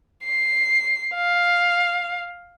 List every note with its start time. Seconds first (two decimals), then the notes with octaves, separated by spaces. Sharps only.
0.24 C7
1.14 F5